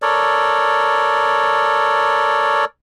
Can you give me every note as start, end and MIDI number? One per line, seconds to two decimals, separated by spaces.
0.02 2.65 69
0.02 2.65 70
0.02 2.65 73
0.02 2.65 74